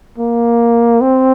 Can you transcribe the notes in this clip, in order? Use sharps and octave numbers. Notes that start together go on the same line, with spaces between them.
A#3
C4